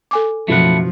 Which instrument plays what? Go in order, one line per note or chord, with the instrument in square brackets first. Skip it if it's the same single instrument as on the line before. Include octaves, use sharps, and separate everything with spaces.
[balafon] A4 G#5 D6
[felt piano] F#1 B2 [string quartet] F3 [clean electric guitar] A3 E4 F#5